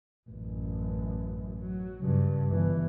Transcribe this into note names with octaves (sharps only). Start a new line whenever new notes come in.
A1 F#2
F#3
G2 C#3
G1 E3